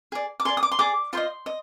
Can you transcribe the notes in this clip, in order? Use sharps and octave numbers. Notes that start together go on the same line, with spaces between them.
G#4 D5
D6
G#4 D5 C6
D#6
D6
C6
G#4 D5 D6
F4 C5 D#5 C6
D#5